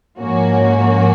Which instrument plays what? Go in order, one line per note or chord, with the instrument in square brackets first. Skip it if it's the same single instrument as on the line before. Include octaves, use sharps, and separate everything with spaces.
[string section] G#2 F3 A#3 C#4 F#4